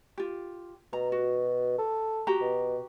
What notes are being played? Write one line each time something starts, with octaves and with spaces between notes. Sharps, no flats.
F4 G4
B2 A#5
F#4
A4
F#4 G4 A#5
B2